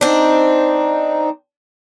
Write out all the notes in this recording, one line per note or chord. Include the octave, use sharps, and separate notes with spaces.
C4 D4 D#4